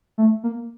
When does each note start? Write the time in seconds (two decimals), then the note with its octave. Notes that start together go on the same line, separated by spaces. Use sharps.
0.18 A3
0.44 A#3